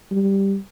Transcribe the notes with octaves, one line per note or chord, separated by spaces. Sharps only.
G3